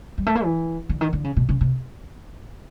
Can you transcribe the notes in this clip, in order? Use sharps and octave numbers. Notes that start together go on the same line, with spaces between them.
G3
A3
A#3
E3
D3
D#3
D3
C#3
B2
C#3
C3